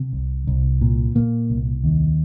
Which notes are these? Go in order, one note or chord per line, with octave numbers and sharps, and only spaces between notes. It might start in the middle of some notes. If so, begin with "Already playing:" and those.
Already playing: C3
C2
C2
A#2
A#2 A#3
C2
D#2